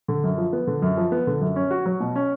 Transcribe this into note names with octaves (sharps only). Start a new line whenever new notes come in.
D3
F#2
F3
B3
D3
F#2
F3
B3
D3
F#2
C#4
F#4
F#3
B2
C#4